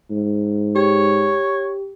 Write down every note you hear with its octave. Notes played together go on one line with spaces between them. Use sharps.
G#2
G4 C#5